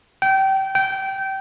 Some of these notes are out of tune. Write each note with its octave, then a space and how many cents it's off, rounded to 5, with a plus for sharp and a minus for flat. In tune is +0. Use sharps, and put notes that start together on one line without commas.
G5 -25
G5 -20